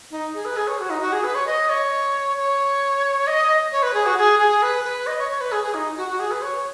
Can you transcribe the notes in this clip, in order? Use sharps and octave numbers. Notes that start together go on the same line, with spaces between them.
D#4
G#4
B4
G#4
C#5
F#4
D#4
F#4
G#4
B4
C#5
D#5
C#5
C#5
D#5
C#5
B4
G#4
F#4
G#4
G#4
B4
B4
D#5
C#5
C#5
B4
G#4
G#4
D#4
F#4
F#4
G#4
B4
C#5